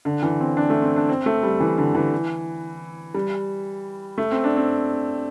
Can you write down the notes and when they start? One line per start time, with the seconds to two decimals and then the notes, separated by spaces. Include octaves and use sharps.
0.05 D3
0.23 E3
0.41 C4
0.57 D4
0.70 A3
0.82 C4
0.96 D4
1.09 C4
1.26 A3
1.43 G3
1.60 E3
1.78 D3
1.95 E3
3.14 G3
4.18 A3
4.31 C4
4.44 D4
4.57 C4